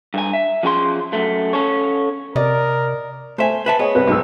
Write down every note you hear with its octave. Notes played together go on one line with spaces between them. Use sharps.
G2 G#5
E5
F3 C#4 G#4 G#5 C6
F#2 A3
C#4 A4 C#5
C3 A#4 D5 D#5
A3 C5 E5 G#5
B4 E5 A5
B3 G#4 C#5 D#5
C2 C4 B4
B1 G#2 E6